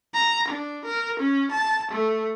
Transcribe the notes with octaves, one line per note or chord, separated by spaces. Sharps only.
A#5
D4
A#4
C#4
A5
A3